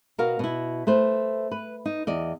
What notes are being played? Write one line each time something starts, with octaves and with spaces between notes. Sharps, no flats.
B2 F#4 A#4 F5
B2 E4
A3 B4 C5
B4
D#4
E2 D5 D#5